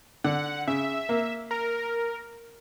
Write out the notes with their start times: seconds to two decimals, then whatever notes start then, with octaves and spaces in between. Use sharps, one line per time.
0.24 D3 F#5
0.68 C#3 E5
1.09 A#3
1.51 A#4